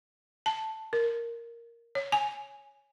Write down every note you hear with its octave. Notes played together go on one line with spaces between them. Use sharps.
A5
A#4
C#5
G#5